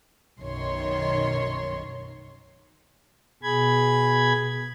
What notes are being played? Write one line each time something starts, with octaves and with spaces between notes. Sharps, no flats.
B1 F#2 D#3 C#5 C6
B2 G#4 B5 G#6